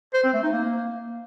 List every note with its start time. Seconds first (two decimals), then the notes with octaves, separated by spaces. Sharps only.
0.14 C5
0.24 C4
0.33 A3
0.43 D#4
0.53 A#3